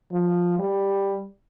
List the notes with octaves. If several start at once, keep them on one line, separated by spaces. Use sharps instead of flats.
F3
G3